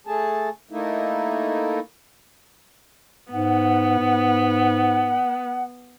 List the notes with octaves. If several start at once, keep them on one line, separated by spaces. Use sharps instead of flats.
A3 G#4 A5
A3 A#3 D#4 E4
G#2 B3 F#5
G#2